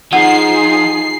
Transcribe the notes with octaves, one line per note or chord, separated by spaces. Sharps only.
F3 D#4 G#4 F#5 C7